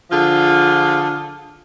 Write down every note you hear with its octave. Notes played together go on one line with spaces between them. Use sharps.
D3 F3 F4 G#4